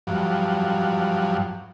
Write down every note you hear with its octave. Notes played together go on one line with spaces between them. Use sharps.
G2 F3 F#3